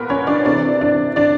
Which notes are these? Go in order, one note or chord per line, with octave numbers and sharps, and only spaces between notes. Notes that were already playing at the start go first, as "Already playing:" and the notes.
Already playing: A#2 B3 A#4 B4
C#4 C#5
D4 D5
C3 E3 D4 D5
D4 D5
D4 D5